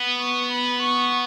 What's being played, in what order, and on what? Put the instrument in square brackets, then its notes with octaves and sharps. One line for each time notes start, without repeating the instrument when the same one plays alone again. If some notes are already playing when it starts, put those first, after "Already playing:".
Already playing: [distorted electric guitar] B3
[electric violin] C#6
B5
C#6